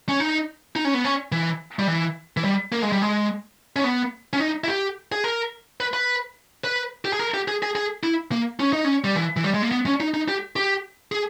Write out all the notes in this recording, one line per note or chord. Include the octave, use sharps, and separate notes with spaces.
C#4
D#4
D#4
C#4
B3
C#4
E3
G3
E3
E3
G3
A#3
G#3
G3
G#3
C#4
B3
C#4
D#4
E4
G4
G#4
A#4
B4
B4
B4
G4
G#4
A#4
G4
G#4
G#4
G#4
E4
A#3
C#4
D#4
C#4
G3
E3
E3
G3
G#3
A#3
B3
C#4
D#4
D#4
G4
G4
G#4